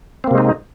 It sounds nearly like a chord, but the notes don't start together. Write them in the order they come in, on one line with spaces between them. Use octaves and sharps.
C4 A#3 C3 G#3 D#4